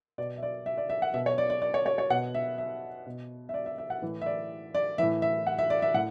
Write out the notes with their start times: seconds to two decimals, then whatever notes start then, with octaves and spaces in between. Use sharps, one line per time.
0.18 B2 D5
0.38 E5
0.43 D5
0.66 E5
0.78 D5
0.90 E5
1.02 F#5
1.14 B2 E5
1.26 C#5
1.38 D5
1.50 D5
1.62 D5
1.74 C#5
1.86 C#5
1.98 C#5
2.10 B2 F#5
2.34 E5
2.58 E5
3.06 B2
3.49 E5
3.54 D5
3.66 E5
3.78 E5
3.90 F#5
4.02 A2 E3
4.21 E5
4.26 D5
4.75 D5
4.98 A2 E3 E5
5.22 E5
5.47 F#5
5.59 E5
5.70 D5
5.82 E5
5.94 A2 F#5